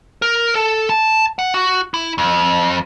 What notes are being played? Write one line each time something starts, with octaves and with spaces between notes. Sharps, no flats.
A#4
A4
A5
F#5
F#4
E4
F2